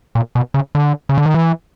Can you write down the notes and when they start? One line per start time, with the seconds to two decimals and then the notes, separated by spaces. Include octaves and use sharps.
0.15 A#2
0.35 B2
0.54 C#3
0.75 D3
1.09 C#3
1.18 D3
1.26 D#3
1.34 E3